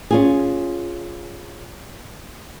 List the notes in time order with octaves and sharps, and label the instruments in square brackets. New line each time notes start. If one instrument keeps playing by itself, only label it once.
[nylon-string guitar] C#4 F4 G#4